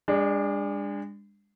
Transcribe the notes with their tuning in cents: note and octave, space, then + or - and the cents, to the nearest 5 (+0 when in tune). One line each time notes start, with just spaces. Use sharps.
G#3 -35 D4 +0